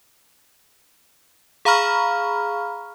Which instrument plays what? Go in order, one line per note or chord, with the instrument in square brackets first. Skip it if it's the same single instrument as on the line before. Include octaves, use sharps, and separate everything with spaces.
[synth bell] G#4 F5 A#5 B5 C#6 F6